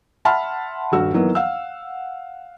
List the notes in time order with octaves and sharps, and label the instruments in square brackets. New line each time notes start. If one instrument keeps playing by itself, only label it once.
[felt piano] E5 F#5 A5 B5 C6 F6
D#1 G2 F#4 E6
D#3 E3 F#3 A#3 B3
F5 F#5 E6